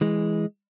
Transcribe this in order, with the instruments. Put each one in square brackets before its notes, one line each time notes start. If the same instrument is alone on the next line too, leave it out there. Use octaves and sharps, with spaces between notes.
[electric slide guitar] E3 G#3